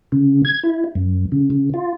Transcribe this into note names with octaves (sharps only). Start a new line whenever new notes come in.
C#3
G#6
E4
F#2
C#3
C#3
F4